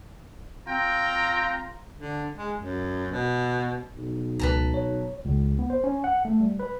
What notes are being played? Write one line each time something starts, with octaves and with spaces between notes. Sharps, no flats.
C4 F4 G5 A#5
D3
G#3
F#2
B2
B1
C#2 B4 A5 A#5
C#5
C#2
B3
C5
C#4
F#5
A3
G3
B4